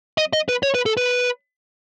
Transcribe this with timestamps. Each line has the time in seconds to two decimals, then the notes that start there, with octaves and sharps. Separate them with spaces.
0.18 D#5
0.33 D#5
0.49 B4
0.63 C#5
0.75 B4
0.86 A4
0.97 B4